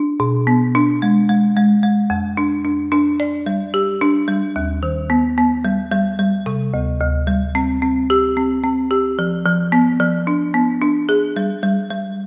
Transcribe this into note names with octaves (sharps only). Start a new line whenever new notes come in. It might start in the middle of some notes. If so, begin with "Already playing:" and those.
Already playing: D4
B2
B3
D4
G#3
G#3
G#3
G#3
F2
D4
D4
D4
D5
G3
G4
D4
G3
D#2
D#3
B3
B3
G3
G3
G3
C3
D2
D2
G3
C4
C4
G4
C4
C4
G4
F3
F3
B3
F3
D4
B3
D4
G#4
G3
G3
G3